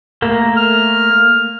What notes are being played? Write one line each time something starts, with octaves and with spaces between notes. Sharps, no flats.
A3 A#3
F6